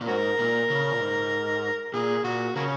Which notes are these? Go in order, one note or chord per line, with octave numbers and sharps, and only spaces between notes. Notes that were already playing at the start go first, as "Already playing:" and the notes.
A#2
G#2 C#4 F#4 A#4
A#2
C#3
A#2
G#2
A#2 G#4
A#2 F#4
C#3 F#3 A#3 C#4